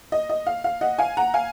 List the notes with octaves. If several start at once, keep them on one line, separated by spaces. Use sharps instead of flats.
D#5
D#5
F5
F5
D#5 F#5
F5 G#5
F#5 A#5
F5 G#5